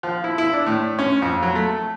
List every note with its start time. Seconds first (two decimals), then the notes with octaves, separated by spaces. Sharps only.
0.03 F3
0.24 E4
0.38 E4
0.53 D4
0.66 A2
0.99 C#4
1.22 F2
1.43 F#3
1.55 A3